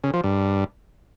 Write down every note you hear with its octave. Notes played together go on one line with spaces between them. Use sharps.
C#3
F3
G2